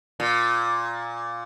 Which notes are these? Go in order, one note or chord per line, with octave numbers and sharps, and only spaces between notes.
A#2